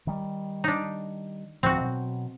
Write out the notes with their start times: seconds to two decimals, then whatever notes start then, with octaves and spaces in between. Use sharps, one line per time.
0.07 D#3 G3
0.64 D4 D#4
1.63 D2 A2 F3 C4 F#4
1.81 B2 F#3